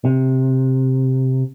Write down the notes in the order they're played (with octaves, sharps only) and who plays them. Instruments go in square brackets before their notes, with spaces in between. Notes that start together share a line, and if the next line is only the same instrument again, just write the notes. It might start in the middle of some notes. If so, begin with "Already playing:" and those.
[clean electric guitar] C3